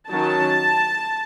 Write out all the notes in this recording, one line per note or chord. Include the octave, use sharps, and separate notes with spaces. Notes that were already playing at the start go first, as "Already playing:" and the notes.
D#3 F#3 C#4 A5